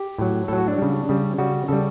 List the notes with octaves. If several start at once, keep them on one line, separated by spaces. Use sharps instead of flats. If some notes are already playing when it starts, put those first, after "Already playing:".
Already playing: G4
A2 F#3
A2 F#3 A4
F#4
D4
C#3 G3
C#3 G3
C#3 G3 F#4
C#3 G3 A4